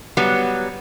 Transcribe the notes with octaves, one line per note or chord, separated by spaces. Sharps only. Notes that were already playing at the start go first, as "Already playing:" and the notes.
F#3 G3 B3